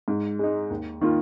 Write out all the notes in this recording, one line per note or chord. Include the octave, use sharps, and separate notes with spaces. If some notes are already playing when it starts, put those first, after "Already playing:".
G#2
G#3 D#4
D#2
D#3 A#3 F4